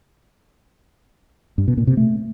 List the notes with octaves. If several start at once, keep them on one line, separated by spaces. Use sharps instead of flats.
G2
B2
A#2
C3
A3